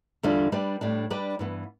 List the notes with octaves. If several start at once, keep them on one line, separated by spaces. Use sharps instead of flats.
E2 D3 G3 D4 F4
G3 D4 G4 B4
A2 G3 D4
G3 D4 G4 B4 D5
G2 E3 B3